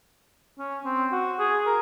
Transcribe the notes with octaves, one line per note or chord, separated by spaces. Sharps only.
C#4
C4
F#4
G#4
A#4